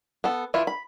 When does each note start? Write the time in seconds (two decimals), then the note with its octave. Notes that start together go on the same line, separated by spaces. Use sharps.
0.24 B3 A4
0.54 E3 E4 F4
0.67 B5